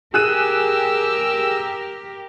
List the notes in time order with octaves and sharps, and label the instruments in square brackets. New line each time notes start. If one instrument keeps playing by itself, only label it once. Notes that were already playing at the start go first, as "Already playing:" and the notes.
[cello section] G4 A#4 [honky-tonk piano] G#4 F#6 D#7 [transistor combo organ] E6